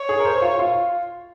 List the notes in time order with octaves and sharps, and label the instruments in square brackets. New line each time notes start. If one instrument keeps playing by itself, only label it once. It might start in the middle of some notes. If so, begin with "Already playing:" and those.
Already playing: [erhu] C#5
[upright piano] G#4
A#4
C5
F4
F4